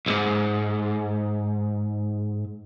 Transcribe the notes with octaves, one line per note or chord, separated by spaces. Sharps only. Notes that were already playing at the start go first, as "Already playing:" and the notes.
B1 G#2